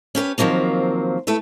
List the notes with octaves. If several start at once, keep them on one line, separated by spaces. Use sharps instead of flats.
C#4 G4 A#4 B4
D#3 F3 F#3 A#3 C4
A3 E4 A4 B4